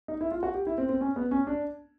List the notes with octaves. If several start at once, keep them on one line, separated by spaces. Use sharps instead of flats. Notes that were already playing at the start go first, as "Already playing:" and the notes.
D#4
E4
F4
F#4
G4
E4
C4
C4
C#4
B3
C#4
D4